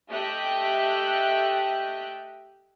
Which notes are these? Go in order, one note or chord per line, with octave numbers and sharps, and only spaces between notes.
A3 G4 D#5 E5 G5 F#6